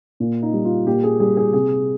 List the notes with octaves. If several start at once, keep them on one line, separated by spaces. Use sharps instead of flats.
A#2
D#4
G3
F4
A#2 G4
G#4
G3 G#4
G#4
C3 G#4